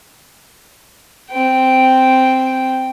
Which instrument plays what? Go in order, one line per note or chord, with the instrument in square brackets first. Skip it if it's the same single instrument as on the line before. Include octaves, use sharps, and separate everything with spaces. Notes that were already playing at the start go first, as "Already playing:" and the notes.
[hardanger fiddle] C4 G5